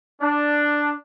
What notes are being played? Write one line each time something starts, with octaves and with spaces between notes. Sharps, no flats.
D4